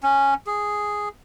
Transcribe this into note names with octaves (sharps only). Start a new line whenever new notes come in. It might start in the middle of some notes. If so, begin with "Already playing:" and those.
C#4
G#4